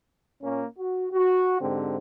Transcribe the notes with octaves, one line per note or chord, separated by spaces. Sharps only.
A#2 A#3 C#4
F#4
F#4
G#2 D3 C4 G4